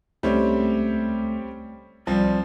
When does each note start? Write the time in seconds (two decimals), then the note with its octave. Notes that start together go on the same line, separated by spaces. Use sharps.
0.23 C#2 G3 A3 C4 C#4
2.07 C2 F3 G3 C4